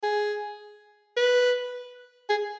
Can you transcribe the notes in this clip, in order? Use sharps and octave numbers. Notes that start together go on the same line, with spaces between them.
G#4
B4
G#4